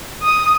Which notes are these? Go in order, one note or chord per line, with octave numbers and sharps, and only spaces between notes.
D#6